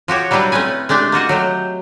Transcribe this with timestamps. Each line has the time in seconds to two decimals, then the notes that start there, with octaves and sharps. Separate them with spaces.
0.08 F3 F#4 G4 C#5
0.31 F#3 G3 D4 E4 B4 A#5
0.52 A3 C4 C#4 B4 G#5
0.89 G#3 A3 D4 G4
1.12 A#3 F4 F#4 D#5
1.29 F#3 A3 G4